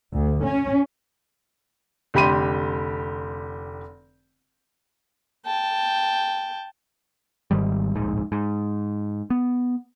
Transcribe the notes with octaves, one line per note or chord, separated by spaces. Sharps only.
D2
C#4
F1 D3 G4 B5 C6 D#7
G5 A5
G#1 G#2 D#3 G3
D1 A#1 G#2
G#2
B3